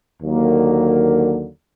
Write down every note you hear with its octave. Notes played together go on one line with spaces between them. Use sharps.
D#2 D3 F#3 A#3